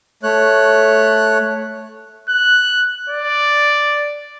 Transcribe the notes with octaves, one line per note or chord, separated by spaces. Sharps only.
A3 C#5 F#6
F#6
D5